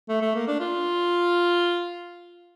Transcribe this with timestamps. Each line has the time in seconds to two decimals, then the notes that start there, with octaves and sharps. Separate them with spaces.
0.09 A3
0.22 A3
0.35 A#3
0.48 D4
0.60 F4